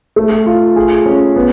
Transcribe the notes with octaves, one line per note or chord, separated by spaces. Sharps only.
A3
F4
G#4
C#4
B3